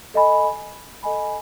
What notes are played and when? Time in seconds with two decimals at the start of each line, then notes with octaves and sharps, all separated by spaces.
0.14 A4 D#5 G#5 B5
1.03 A4 D#5 G#5 B5